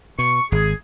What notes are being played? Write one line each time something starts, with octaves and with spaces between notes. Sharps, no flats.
B2 C#6
G#1 G#4